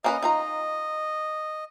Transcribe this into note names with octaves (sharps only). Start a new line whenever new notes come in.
A#3 C#4 B4 D#5
D#4 F4 A#5